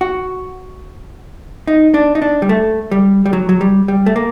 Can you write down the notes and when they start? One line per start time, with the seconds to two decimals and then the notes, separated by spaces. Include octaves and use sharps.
0.01 F#4
1.67 D#4
1.94 D4
2.15 D#4
2.22 D4
2.42 G3
2.49 A3
2.91 G3
3.26 G3
3.33 F#3
3.49 F#3
3.61 G3
3.88 G3
4.06 A3
4.16 A#3